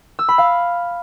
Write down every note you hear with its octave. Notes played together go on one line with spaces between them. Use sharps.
E6
B5
F5